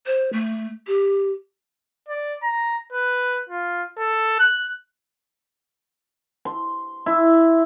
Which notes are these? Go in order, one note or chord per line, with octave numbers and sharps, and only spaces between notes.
C5
A3
G4
D5
A#5
B4
F4
A4
F#6
C6
E4